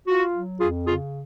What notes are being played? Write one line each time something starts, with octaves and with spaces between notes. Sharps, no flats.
F4 F#4
F#3
F2 F4 G#4
C#3 F4 G#4